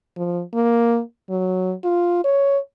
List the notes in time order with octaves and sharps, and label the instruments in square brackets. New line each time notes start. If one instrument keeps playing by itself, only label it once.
[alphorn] F3
A#3
F#3
F4
C#5